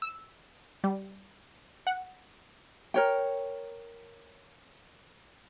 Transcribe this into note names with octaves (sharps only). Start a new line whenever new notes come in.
E6
G3
F#5
A#4 C#5 G5